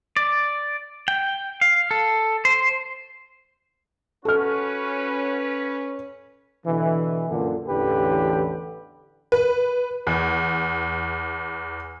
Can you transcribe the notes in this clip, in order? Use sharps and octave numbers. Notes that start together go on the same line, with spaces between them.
D5
G5
F5
A4
C5
C#4 F#4 A4 B4 F6
B2 D3 E3
F#2 A#2 D3
A1 E2 D3 G4 B4
B4
E2